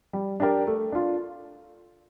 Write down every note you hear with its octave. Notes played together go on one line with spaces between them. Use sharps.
G3
D4 G4 A#4 D5
A3
D4 F4